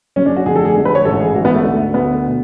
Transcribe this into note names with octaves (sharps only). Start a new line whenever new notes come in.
F#1 F#2 C#3 C#4
D4
F#4
F1 F2 D3 G#4
A4
G#4
F1 F2 D3
B4
C#5
A1 G#2 A4
G#4
A1 G#2 F#4
B3
A3
D2 D3
D2 D3 B3
B2